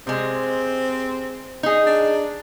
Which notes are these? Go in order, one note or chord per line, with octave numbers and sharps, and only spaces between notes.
C3 G#3 C4
D#4 G#4
D4